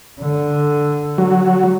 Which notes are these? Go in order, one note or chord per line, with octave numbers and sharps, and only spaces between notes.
D3
F#3